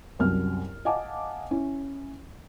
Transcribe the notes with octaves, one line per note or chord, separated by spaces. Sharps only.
C2 F#2 F6
D#5 F5 F#5 G#5 A5 D6
C#4 E4